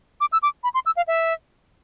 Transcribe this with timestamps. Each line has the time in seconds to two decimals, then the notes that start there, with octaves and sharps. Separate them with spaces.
0.21 D6
0.32 E6
0.43 D6
0.63 B5
0.74 C6
0.86 E6
0.97 F5
1.08 E5